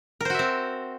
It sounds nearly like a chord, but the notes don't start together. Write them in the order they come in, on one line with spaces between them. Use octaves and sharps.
A#4 C5 F#4 E5 C4